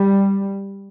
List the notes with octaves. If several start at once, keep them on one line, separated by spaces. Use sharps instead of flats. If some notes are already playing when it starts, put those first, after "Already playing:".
Already playing: G3